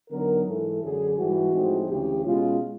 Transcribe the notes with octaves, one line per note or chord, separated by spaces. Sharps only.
D3 F#3 B3 D#4 A#4
G#2 E3 G#3 A4
F#2 D3 F#3 G#4
G#2 E3 G3 F#4
A2 F3 G#3 C4 D#4
D2 C#3 E3 G4
B2 G#3 C#4 F4